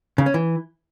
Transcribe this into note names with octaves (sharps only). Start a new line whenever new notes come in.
C#3
C#4
E3